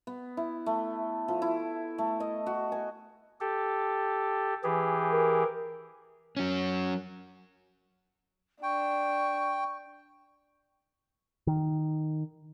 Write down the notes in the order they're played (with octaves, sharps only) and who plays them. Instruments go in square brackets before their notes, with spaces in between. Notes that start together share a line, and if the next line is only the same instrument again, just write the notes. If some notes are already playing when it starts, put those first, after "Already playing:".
[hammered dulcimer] B3
E4
A3
F3
E4
A3
D#5
F#4
G#5
[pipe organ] G4 A4
[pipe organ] E3 G4 G#4 [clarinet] B4
[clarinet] A#4
[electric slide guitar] F#3 C#4
[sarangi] D4 [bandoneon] G5 [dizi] C#6
[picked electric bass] D#3